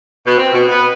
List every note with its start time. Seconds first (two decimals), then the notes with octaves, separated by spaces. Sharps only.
0.24 B2
0.37 C4
0.52 B2
0.69 B3